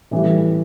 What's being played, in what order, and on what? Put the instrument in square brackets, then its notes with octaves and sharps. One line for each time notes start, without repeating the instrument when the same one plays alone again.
[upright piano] A2 E3 G3